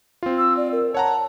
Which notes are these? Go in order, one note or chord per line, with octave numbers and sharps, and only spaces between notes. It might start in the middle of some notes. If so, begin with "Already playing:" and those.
C4 F4
E6
D5
A#4
C#5 F#5 A5 A#5